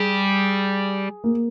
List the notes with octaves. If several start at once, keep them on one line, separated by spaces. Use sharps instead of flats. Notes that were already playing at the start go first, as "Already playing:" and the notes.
Already playing: G3 G#4
A#3